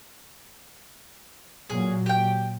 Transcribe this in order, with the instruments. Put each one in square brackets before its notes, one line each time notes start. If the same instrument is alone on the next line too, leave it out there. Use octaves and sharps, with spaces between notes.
[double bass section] A#2 F#3 [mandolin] G#4
[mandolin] G4 G5